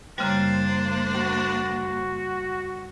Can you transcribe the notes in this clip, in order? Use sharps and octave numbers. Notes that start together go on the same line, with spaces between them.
F#2 C#3 G3 A#3 D4 C5
F#4